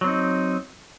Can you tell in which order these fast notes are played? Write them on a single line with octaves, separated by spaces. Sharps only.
F#3 C4 D#4